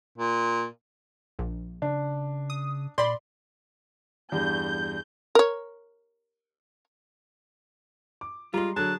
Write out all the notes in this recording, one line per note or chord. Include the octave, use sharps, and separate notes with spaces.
A#2
A#1
C#3 D4
D#6
A#2 D5 B5 C6
E2 G2 G6
A#4 C#5
D6
G3 G#3 F4 A#5 C6
D3 F#3 G#4 A5 F#6